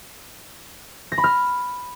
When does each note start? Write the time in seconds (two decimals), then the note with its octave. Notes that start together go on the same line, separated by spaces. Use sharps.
1.12 A#6
1.18 B5
1.24 F6